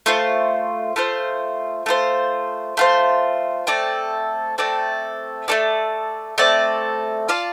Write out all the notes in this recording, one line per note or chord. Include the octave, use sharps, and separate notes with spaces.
A3 F4 C5
A3 F4 C5
A3 F4 C5
A3 F4 C5
A3 C4 A4 D5
A3 C4 A4 D5
A3 C4 A4 D5
A3 C4 A4 D5
F4 D5 F5 A5